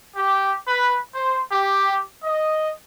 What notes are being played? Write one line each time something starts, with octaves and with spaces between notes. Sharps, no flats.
G4
B4
C5
G4
D#5